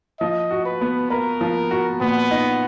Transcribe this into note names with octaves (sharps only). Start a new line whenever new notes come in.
F3 D#5
F#4
B4
B3
A#4 B4
F3
F#4
A#2 B3
D#4